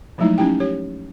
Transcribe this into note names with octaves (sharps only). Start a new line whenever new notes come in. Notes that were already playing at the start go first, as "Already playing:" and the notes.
F3 F#3 G#3 A3 D#4 E4
C#4 D#4 E4 G4 G5
G4 C#5